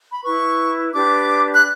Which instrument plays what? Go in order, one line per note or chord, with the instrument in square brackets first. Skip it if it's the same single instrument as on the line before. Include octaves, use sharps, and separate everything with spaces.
[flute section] B5
E4 B4 C#6
D4 G4 B4 D6
F#6